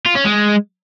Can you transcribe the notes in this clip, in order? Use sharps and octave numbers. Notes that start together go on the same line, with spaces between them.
F4
C#4
G#3